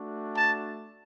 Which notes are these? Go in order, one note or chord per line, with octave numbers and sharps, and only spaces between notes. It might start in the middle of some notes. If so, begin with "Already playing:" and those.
Already playing: A3 D4 F#4
A5